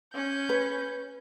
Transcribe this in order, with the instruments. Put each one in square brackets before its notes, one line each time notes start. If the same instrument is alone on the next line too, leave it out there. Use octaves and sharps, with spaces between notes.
[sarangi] C#4 [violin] G6
[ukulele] B4